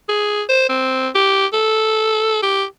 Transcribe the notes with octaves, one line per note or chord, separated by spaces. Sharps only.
G#4
C5
C4
G4
A4
G4